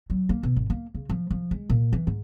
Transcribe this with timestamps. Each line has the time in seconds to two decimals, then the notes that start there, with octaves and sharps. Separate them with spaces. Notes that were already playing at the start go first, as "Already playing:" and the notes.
0.10 F#3
0.29 A#3
0.43 B2
0.56 G#1
0.70 A#3
0.95 C#3
1.09 F3
1.31 F3
1.51 G#3
1.70 A#2
1.93 E3
2.07 G#2